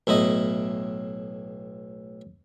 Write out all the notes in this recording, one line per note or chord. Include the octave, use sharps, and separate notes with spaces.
B1 A2 E4 D#5